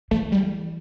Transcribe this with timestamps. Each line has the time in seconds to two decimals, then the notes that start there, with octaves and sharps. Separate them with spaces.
0.11 E3 A3
0.32 G3